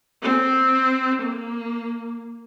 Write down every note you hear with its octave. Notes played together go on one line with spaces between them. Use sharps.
C4
A#3